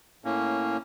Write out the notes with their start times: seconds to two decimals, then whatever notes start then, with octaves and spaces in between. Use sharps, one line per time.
0.25 A2 A#3 C#4